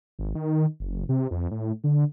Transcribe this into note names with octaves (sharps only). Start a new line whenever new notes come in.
G#1
D#3
F#1
C3
F2
A2
D3